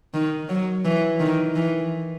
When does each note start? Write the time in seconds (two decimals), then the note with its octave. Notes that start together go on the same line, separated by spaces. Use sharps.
0.14 D#3
0.49 F#3
0.85 E3
1.20 D#3
1.56 E3